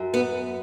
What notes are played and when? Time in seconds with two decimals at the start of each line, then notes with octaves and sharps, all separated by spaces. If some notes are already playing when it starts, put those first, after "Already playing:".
Already playing: F#2
0.14 B3